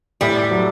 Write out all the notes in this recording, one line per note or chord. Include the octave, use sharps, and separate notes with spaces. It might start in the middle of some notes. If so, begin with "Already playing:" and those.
A2 G3
F#3